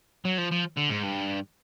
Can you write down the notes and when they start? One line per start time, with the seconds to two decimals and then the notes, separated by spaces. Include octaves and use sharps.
0.25 F#3
0.38 F3
0.52 F3
0.78 D3
0.90 G#2
1.04 G2